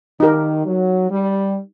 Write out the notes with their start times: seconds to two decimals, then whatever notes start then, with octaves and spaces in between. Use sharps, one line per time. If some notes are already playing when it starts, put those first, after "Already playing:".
0.20 D#3 D#4 G4 A#4
0.66 F#3
1.11 G3